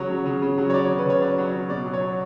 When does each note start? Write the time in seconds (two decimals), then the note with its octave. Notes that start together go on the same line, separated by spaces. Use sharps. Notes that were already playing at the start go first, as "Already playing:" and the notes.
Already playing: C#3 F#3 C#5
0.10 F#3
0.26 C#3
0.42 C#3
0.58 F#3
0.70 C#5
0.73 F#3 D5
0.85 C#3 C#5
0.98 B4
1.05 C#3 C#5
1.21 F#3 D5
1.38 F#3
1.45 C#5
1.53 C#3
1.68 B2 D5
1.86 F#3
1.94 C#5
2.01 F#3